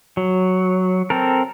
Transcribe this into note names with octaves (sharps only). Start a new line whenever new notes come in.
F#3
C4 A4 A#4